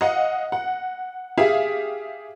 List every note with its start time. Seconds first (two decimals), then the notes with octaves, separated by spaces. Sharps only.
0.01 D#5 F5 F#5
0.52 F#5
1.37 G4 G#4 E5 F5